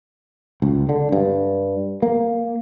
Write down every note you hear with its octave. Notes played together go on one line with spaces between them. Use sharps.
C#2
D3
G2
A#3